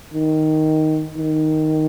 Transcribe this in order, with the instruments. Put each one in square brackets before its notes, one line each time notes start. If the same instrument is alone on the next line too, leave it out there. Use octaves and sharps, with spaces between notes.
[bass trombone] D#3
D#3